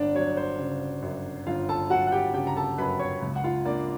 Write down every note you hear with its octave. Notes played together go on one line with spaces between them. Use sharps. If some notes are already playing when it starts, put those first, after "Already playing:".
Already playing: G1 D4 D5
F#3 C#5
C5
C#3
F#2
G1 F4 F5
A4 A5
F#3 F#4 F#5
F#5
G4 G5
C#3 G4 G5
A#5
A4 A5
F#2 B4 B5
C#5 C#6
C#2
F#5
F4 F5
A#3 D4 D5